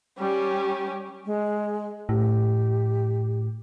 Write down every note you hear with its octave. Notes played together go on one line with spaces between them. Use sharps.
G3 C#4 G4
G#3
A2 G4